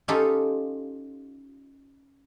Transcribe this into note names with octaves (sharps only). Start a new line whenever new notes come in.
C#4 D#4 F4 G4 A4